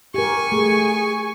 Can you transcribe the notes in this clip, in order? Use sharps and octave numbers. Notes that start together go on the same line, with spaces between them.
G4 A#4 G#5 C#6
A3 G#4